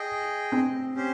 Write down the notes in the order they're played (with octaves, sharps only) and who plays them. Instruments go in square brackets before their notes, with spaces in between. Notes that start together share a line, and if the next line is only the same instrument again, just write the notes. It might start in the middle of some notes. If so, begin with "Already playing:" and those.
Already playing: [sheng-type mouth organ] G#4 D#5 G5
[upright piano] C4
[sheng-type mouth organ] C#4 G4 C5